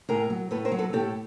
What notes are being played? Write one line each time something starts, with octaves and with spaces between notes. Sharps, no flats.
A2 G#4 A#4
F#3
A2 A4 B4
A#4 C5
F#3
A4 B4
A2 G4 A4